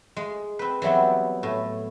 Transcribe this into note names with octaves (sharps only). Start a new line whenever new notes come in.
G#3
C4 B4
E3 F#3 G3 B3 C4
A2